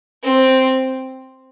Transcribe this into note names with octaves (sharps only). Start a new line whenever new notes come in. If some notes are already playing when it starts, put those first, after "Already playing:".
C4